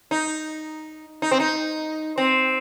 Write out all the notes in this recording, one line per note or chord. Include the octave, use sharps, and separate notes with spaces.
D#4
D#4
C4
D#4
C4